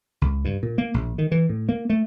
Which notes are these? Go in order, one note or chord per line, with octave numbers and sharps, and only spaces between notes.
C#2
G2
A#2
A#3
A#1
D#3
E3
A2
A#3
A3